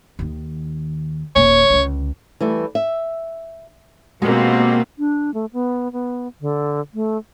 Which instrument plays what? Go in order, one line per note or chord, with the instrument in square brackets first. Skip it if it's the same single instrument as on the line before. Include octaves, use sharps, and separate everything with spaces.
[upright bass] D#2 D#3
[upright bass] D#1 A#3 [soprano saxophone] C#5
[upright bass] C#2 D3
[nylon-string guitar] E3 G3 A3
E5
[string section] B2 A#3 C4 [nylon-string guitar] G#3 F#4 G4
[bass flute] D4
A3
B3
B3
D3
A3